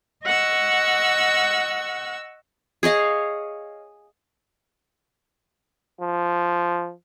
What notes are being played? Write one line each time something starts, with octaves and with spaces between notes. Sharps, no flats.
D#5 F#5 C#6 E6
G#4 C#5 D#5 F5
F3